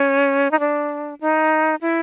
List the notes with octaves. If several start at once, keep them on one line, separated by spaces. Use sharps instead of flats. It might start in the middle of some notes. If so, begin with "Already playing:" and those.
Already playing: C#4
D#4
D4
D#4
E4